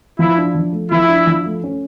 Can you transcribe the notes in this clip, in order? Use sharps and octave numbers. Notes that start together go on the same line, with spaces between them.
F3 E4
D4
F3
A3
F3 E4
D4
F3
A3
C#4